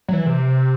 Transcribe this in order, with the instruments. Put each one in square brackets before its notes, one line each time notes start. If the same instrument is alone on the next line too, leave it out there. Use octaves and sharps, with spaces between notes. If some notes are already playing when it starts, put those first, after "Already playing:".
[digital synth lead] F#3
E3
C3